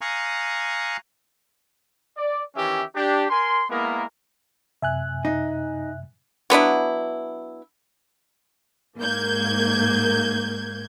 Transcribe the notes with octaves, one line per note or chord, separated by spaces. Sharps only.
F5 G#5 A#5 C#6 D#6 F#6
D5
D#3 E3 C#4 G4 E5
D4 G4
A#4 G#5 C6
G#3 A#3 B3 E4 A#4
F#2 C3 E5 G#5 F#6
D#4
F#3 B3 D4 E4
G#2 A#3 G6 G#6